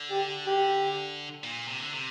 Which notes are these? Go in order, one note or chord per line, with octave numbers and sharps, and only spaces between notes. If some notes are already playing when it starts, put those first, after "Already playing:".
Already playing: D3
G4
G4
A#2
C3
D3
C3